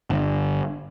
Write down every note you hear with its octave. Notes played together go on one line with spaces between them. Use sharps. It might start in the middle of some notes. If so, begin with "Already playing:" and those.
G1